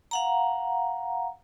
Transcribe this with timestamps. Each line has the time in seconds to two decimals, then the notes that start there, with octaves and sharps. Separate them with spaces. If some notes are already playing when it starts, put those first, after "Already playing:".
0.11 F5 F#5 A#5